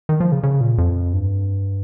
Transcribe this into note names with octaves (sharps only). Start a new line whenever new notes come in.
D#3
F3
C#3
C#3
A#2
F2
G2